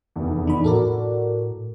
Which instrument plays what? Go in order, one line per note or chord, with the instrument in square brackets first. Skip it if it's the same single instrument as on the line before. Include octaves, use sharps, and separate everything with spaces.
[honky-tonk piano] F1 E2
[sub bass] E3 [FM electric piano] D4 D#4 B5
[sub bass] A2 [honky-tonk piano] F#4 [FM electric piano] A4 A#4 D5